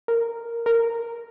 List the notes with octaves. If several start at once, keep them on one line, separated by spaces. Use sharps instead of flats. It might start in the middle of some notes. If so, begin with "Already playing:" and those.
A#4
A#4